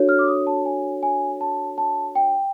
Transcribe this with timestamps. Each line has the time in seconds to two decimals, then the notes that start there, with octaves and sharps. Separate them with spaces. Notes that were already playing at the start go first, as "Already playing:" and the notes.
Already playing: D4 F#4 A4 C#5
0.09 F6
0.19 D6
0.28 D#6
0.47 A5
0.65 G#5
1.03 G#5
1.41 A5
1.78 A5
2.15 G5